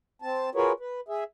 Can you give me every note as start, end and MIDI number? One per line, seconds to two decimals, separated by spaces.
0.22 0.50 60
0.22 0.50 81
0.55 0.72 65
0.55 0.72 66
0.55 0.72 68
0.55 0.72 70
0.55 0.72 71
0.55 0.72 73
0.80 1.00 71
1.08 1.24 68
1.08 1.24 76